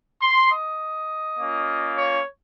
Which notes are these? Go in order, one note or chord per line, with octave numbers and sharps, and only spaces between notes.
C6
D#5
A#3 C#4 F4
C#5